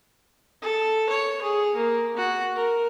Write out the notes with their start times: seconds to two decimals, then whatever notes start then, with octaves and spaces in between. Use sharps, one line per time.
0.62 A4
1.10 C#5
1.42 G#4
1.76 A#3
2.17 F#4
2.55 A#4